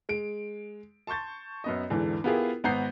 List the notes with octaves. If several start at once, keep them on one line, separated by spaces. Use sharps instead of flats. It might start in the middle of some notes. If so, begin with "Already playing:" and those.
G#3 D7
A5 C6 C#6 G6 A6
F#2 B3 D#5
E2 G#2 D3 E3
B3 E4 F4 G4 G#4 A#4
G#1 B3 F#5 A#5 G6 C7